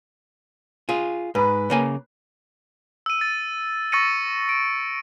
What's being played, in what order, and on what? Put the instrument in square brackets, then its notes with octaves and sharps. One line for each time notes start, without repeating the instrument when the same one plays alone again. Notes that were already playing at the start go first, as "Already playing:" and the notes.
[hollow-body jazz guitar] F4 G#4
[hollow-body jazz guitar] G#2 [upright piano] B4 B5
[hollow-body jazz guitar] C#3 A#3 G#5
[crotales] E6 D#7
A6
C#6 E6 A6 A#6 C#7 D#7
D7